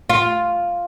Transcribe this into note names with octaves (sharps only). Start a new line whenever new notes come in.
F4